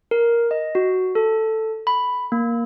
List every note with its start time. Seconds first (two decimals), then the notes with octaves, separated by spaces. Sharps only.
0.11 A#4
0.51 D#5
0.75 F#4
1.15 A4
1.87 B5
2.32 A#3